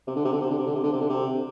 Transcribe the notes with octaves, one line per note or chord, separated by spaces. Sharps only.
C3
D3
C3
D3
C3
D3
C3
D3
C3
D3
C3
D3
C3